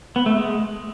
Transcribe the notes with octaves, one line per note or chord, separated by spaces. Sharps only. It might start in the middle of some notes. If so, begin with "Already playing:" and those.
B3
A3
G#3